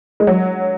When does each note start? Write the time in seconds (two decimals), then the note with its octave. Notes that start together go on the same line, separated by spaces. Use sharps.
0.20 G#3
0.27 F#3